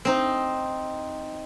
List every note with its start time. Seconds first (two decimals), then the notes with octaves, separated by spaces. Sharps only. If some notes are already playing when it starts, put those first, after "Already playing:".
0.05 C4 D#4